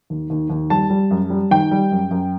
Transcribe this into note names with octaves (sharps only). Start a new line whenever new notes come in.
D#2
D#2
D#2
G3 A5
G3
F#2
G3
D#3 G5
G3
F#2
F#2